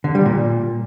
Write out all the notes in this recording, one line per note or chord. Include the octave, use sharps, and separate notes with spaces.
D3
G3
A#2